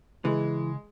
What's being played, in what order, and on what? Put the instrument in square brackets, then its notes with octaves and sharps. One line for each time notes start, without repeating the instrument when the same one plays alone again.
[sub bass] C#3 [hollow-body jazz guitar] E3 [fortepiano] G#3